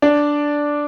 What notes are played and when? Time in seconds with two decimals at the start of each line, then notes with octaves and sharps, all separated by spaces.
0.02 D4 D5